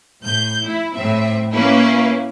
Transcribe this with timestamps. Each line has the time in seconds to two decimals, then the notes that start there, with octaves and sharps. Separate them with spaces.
0.21 A2 G6
0.63 E4
0.93 A2 C4 E5
1.53 A#3 C#4 E4 B4